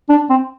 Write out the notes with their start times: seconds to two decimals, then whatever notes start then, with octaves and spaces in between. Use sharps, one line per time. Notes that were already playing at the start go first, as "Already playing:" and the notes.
0.09 D4
0.30 C4